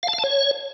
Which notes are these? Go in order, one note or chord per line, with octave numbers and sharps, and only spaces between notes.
F5
A5
F5
A5
C#5